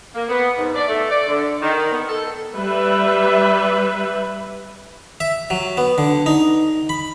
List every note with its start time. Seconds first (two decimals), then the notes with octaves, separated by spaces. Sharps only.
0.15 A#3
0.29 B3
0.58 G#2
0.75 D5
0.88 A3
1.10 D5
1.28 D3
1.61 D#3
1.91 B3
2.08 A4
2.55 G3 B4 E5
5.20 E5
5.50 F#3
5.77 B3
5.98 D3
6.26 D#4
6.89 B5